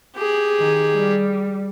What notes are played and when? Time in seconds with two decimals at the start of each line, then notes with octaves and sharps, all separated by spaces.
0.16 G4 G#4
0.58 D#3
0.96 G3